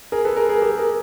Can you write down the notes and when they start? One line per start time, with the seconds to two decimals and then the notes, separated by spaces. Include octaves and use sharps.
0.12 G#4 A#4
0.25 A4 B4
0.36 G#4 A#4
0.49 G#4 A#4
0.62 G4 A4
0.77 G#4 A#4